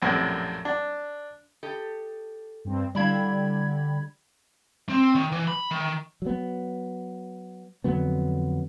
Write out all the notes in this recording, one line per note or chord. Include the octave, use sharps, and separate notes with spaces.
A#1 F#2 A2 C3
D4
G4 A4 D#5
G2 C4
D3 G3 D4 E4 F5 B5 G#6
C4
D#3
E3
B5
D#3
F#3 B3
F2 D3 F#3 B3